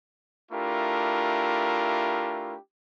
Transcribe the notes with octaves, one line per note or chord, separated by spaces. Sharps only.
A3 D4 E4 F4 G4 A#4